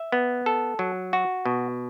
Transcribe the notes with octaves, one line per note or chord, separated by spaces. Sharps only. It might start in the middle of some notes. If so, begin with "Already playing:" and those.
Already playing: E5
B3
A4
F#3
F#4
B2